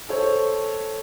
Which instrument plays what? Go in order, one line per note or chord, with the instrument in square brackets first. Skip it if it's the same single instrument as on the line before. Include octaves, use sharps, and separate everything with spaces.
[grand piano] A4 C5 C#5